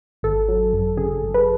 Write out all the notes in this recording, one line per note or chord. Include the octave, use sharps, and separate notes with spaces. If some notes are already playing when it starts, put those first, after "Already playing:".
G#1 A4
F#3
F#2
C#3 G#4
G#1
B4